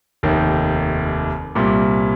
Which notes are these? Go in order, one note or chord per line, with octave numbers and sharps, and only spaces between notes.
F1 D#2 D#3
C2 A#2 G3